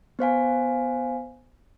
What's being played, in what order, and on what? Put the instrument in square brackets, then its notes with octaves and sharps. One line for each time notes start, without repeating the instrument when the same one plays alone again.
[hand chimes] B3 C5 F5 G#5